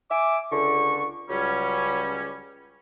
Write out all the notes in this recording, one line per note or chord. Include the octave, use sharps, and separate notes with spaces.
E5 G#5 D6
C#2 D3 C#6
C#2 F#3 G3 C#4